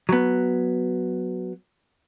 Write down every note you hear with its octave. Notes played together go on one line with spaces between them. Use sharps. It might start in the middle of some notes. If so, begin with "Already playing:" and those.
F#3 B3